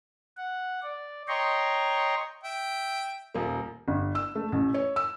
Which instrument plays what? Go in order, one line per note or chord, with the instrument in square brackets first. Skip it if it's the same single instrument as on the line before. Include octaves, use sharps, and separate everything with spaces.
[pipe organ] F#5
D5
C#5 D#5 G5 A#5 C6 C#6
[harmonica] E5 G5
[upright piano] D#1 A#3
[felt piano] G1
E6
A3
A1
C#5
E6